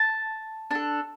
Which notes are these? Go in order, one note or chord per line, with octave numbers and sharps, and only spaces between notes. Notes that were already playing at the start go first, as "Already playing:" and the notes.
Already playing: A5
D4 A4